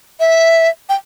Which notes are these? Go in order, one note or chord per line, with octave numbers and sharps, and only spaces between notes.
E5
G5